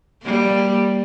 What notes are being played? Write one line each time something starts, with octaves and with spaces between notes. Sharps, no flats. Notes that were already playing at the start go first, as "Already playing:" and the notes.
G3 A#3